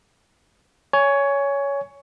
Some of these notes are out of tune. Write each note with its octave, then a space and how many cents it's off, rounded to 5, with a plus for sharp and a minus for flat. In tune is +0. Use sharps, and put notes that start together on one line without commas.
C#5 +15 G#5 +0